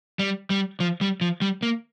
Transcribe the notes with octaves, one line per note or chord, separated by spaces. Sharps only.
G3
G3
F3
G3
F3
G3
A#3